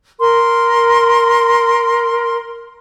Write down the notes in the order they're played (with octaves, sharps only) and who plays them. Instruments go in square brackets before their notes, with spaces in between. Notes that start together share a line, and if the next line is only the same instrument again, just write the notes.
[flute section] A#4 C6